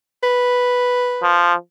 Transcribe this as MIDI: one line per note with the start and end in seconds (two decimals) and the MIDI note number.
0.23 1.41 71
1.23 1.54 53